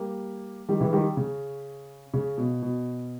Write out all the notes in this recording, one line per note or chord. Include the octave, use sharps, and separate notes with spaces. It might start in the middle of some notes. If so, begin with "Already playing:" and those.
Already playing: G3 A#3
D#3 G3
C#3 E3
D#3 G3
C#3
C#3
B2
B2